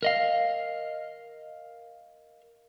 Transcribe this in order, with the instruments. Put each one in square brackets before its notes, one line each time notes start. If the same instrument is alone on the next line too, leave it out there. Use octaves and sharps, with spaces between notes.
[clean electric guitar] A#4 D#5 F5